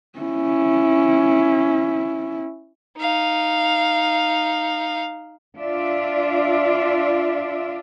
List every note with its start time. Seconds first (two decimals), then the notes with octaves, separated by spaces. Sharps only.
0.19 C#4 E4
2.98 D#4 F5
5.58 D4 F4 D5 E5